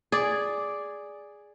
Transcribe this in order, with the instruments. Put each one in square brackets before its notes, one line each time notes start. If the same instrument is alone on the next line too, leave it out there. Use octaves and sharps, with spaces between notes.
[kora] G#4 D5